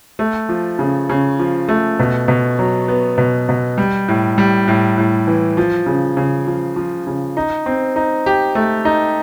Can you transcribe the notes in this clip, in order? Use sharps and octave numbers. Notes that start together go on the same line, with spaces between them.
A3
F3
C#3
C#3
F3
A3
B2
B2
F#3
B3
B2
B2
G3
A2
G3
A2
A2
E3
F3
C#3
C#3
F3
F3
C#3
D#4
C4
D#4
G4
A3
D#4